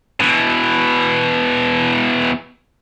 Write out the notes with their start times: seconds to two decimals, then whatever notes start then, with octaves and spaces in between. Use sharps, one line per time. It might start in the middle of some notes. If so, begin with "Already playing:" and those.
0.21 B2 E3